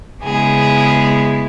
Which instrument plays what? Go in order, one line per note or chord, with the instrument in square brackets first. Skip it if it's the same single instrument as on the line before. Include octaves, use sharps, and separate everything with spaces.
[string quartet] C#3 G#3 B3 E4 G#4